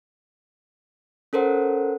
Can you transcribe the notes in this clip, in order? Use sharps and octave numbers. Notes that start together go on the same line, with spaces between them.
C#4 A4 A#4 C5 F#5